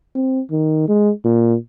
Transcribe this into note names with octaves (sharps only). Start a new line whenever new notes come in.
C4
D#3
G#3
A#2